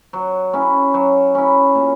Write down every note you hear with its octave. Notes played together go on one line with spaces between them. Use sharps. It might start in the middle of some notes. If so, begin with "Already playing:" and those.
F#3
C#4 E4
F#3
C#4 E4
A#2